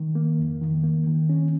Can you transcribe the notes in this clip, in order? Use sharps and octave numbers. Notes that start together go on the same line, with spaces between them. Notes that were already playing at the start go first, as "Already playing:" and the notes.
Already playing: D#3
A#3
F2
D#3
A#3
D#3
C#4